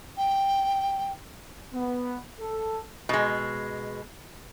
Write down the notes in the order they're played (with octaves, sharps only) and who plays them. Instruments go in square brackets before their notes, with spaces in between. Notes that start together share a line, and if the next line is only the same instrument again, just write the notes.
[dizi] G5
[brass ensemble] B3
A4
[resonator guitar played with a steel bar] B2 G#3